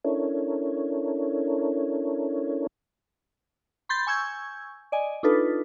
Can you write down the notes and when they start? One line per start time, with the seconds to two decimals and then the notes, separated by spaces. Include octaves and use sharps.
0.05 C#4 D4 E4 A4 A#4 C#5
3.89 B5 C6 G6 A6
4.07 G#5 C#6 E6 G6 G#6
4.92 D5 D#5 G#5
5.23 D4 D#4 F4 A4 B4